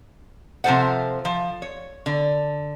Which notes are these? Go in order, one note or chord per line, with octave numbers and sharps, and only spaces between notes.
C3 F3 C#4 A4 C5 F#5
F3
C#5
D3